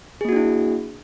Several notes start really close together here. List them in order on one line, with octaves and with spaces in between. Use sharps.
G#4 A#3 F#4 D4 E4